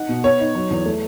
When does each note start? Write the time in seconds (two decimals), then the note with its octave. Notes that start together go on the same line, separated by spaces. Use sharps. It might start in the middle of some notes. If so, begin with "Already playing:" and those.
Already playing: D#4 F#5
0.09 B2
0.24 B3 C#5
0.40 D#4
0.55 F#3
0.71 E2
0.85 A3